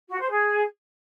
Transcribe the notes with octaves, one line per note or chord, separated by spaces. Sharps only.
F#4
C5
G#4